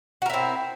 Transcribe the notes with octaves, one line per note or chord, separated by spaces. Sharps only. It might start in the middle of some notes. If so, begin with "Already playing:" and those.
C4 E4 F#4 A#4